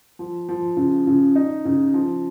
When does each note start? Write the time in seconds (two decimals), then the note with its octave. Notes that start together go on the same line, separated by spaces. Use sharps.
0.19 F3
0.49 F3
0.77 C#3
1.07 C#3
1.35 D#4
1.65 C#3
1.94 F3